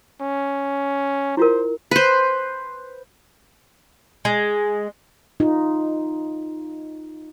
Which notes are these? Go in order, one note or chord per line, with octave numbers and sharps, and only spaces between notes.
C#4
E4 F4 A#4 C5
B4 C5
G#3
D#4 F4